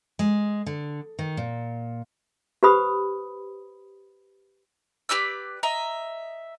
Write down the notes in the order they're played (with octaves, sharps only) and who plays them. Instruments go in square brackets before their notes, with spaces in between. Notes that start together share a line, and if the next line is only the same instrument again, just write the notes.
[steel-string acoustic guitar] G#3
D3
D#3
A#2
[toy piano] G4 B4 C5 B5 D#6
[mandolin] G4 B4 D5 E6
D#5 E5 A#5